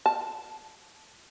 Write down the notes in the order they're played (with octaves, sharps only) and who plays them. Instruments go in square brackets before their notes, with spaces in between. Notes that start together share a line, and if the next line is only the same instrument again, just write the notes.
[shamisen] A5